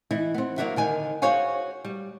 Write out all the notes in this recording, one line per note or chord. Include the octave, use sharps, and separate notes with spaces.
E3 D#4 E4
B3 C4
F#3 A#3 D4 F#4 E5
D3 D#3 G#5
F#4 G#4 C5 C#5 F5 G#5
G3